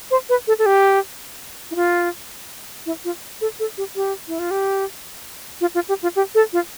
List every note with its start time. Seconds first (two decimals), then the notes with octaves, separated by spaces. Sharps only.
0.11 C5
0.29 B4
0.47 A4
0.59 A4
0.66 G4
1.71 E4
1.75 F4
2.86 E4
3.05 F4
3.41 A4
3.59 A4
3.78 G4
3.96 G4
4.28 E4
4.39 F4
4.51 G4
5.61 F4
5.75 F4
5.89 G4
6.03 F4
6.16 G4
6.35 A4
6.53 F4